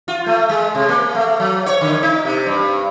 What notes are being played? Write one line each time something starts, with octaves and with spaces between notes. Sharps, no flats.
F4
A3
G#3
C3
A#3
A3
F#3
C#5
D3
D#4
C3
G2